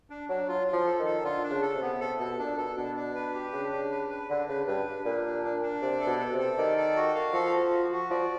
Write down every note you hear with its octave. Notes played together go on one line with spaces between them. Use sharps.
D4
F#3 D4
F#3 F4
F4
F3
A4
D#3
A4
D3 F4
D4
C#3
A4
C3
B3
C3 A4
B2 A4
A#2 D4
B2 A4
B2 D4
D4
B4
G4
C#3 D4
D4
B4
B4
D3 D4
C#3 B4
G2 B4
D4
A#2 D4
D4
D4
D4
C3 D5
A4
B2
A4
C3
A4
D#3 D5
A4
F#4
F5
F3 A4
F#4
F#4
F#4
F3 D5